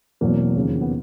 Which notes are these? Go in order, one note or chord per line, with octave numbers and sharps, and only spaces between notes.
E2 B2 F#3 A#3 C4
D#2 C#3 F3
B3